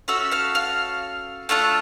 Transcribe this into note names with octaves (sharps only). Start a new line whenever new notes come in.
C#4 F#4 A4 E5 E6
F5 F6
F5 F6
A3 D4 F4 A4